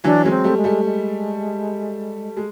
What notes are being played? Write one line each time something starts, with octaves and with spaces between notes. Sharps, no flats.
E3 F#3 D4
F#3 G#3 C#4
C4
G3 A3
G#3
G3 A3
G#3
G#3